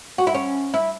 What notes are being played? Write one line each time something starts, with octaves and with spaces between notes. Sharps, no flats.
F#4
E4
C#4
E4